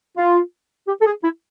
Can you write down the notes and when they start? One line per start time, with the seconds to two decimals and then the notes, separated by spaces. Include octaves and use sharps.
0.17 F4
0.88 G4
1.01 A4
1.06 G#4
1.23 E4